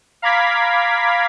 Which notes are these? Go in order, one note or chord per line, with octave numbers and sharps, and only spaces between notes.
F5 A#5 B5 D6 G#6 B6